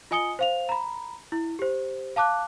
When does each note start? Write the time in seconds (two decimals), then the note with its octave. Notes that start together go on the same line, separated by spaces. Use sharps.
0.11 F4 D#5 G#5 D#6 C#7 G7
0.39 C5 F5 F7
0.69 A#5 B5
1.32 E4
1.59 G4 C5
2.16 F5 A5 D6 F#6